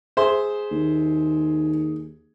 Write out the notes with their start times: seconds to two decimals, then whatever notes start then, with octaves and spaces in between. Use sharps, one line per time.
0.17 G#4 C5 E5 C6
0.71 D#2